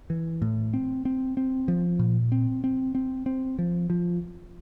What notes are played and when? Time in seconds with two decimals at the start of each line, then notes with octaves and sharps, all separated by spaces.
0.10 E3
0.42 A2
0.74 C4
1.05 C4
1.37 C4
1.68 F3
1.99 A#2
2.32 C4
2.64 C4
2.95 C4
3.26 C4
3.59 F3
3.90 F3